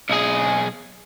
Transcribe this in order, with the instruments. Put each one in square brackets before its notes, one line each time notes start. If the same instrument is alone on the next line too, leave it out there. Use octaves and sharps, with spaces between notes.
[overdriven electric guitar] B1 G#4